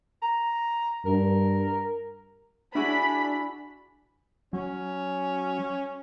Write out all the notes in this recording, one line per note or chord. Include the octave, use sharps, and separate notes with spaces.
A#5
G2 A#4
D4 E4 F#4 G#4 B5
F#3 C#4